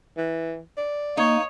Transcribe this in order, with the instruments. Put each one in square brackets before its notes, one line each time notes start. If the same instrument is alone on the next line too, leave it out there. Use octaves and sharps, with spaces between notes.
[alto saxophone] E3
D5
[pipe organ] A#3 [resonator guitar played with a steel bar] D#4 [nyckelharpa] C#5